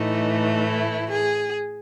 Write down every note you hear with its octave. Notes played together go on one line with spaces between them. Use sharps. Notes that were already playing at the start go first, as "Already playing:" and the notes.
Already playing: A2 E3 A3 D#4
E4
G#4